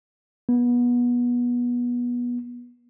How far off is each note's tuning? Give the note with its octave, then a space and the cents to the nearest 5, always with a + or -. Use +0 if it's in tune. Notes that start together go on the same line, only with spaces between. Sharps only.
B3 -25